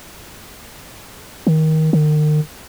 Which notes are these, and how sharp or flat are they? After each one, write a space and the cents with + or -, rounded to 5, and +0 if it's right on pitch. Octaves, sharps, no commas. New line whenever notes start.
D#3 +20
D#3 -40